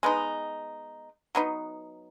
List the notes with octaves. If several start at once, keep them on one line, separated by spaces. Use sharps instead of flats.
G#3 B3 D#4
F#3 B3 D#4